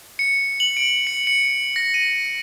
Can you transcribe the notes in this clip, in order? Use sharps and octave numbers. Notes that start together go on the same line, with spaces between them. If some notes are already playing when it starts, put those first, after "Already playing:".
C#7
F#7
D7
C#7
C#7
A#6
D#7